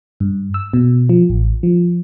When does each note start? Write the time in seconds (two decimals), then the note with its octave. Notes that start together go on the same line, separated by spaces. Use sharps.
0.20 G2
0.54 E6
0.73 B2
1.09 F3
1.30 A1
1.63 F3